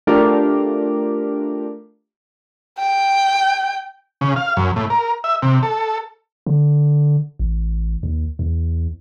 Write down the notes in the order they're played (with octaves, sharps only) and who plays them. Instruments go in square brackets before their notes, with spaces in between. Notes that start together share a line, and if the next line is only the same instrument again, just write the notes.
[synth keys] A3 D4 F4 G4 A#4
[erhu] G5
[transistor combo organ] C#3
F5
F#2
A2
A#4
E5
C3
A4
[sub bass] D3
A1
D#2
E2